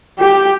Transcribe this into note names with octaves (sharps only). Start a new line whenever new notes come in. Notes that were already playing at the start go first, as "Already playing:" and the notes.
G4